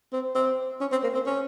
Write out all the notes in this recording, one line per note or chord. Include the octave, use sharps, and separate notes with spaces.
C4
C4
C#4
C4
A#3
C4
C#4